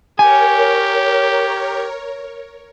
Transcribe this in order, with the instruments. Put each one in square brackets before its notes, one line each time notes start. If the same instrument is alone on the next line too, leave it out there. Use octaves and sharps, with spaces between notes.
[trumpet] G4 [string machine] A#4 C#5 [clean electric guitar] G#5